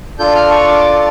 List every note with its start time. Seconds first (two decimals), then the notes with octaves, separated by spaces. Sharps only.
0.19 D4 F4 A4 G6
0.35 F6
0.51 C#6
0.67 D6